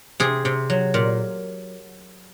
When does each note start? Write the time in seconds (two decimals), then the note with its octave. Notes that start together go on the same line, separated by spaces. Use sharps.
0.20 C3 G#4
0.45 C3
0.70 F#3
0.94 A#2